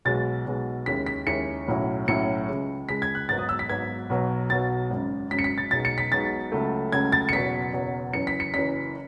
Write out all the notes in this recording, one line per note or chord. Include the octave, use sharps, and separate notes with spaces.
B1 B2 G#3 A6
B1 B2 G#3
D#2 C#3 G#3 C#4 E4 B6
B6
D#2 C#3 G#3 C#4 E4 C#7
B1 A2 F#3 C#4 E4
B1 A2 F#3 C#4 E4 C#7
C#2 C#3 G#3
C#2 C#3 G#3 B6
G#6
F#6
G#1 G#2 F#3 B3 A6
D#6
E6
B6
G#1 G#2 F#3 B3 G#6
B1 B2 F#3
B1 B2 F#3 A6
G#1 F#2 C#3
G#1 F#2 C#3 B6
C#7
B6
A6
B1 B2 G#3 D#4 A6
C#7
B6
B1 B2 G#3 D#4 A6
C#2 C#3 F#3 A3
C#2 C#3 F#3 A3 G#6
A6
C#7
F#1 E2 B2 F#3 B6
F#1 E2 B2 F#3
F#1 F#2 E3 C#7
B6
C#7
F#1 F#2 E3 B6